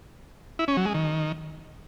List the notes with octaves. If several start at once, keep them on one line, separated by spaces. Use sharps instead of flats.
E4
C#4
F#3
G#3
D#3